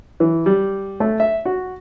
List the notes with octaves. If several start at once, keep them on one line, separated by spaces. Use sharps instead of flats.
E3
G3
A3
E5
F#4